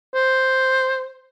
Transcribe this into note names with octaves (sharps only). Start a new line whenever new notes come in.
C5